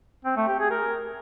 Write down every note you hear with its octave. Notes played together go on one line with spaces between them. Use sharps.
C4
A3
G4
G#4
A#4